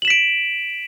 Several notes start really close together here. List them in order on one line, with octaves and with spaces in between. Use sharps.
F#7 E7 B6 D7